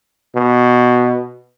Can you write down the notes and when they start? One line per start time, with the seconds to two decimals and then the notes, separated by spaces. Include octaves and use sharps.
0.36 B2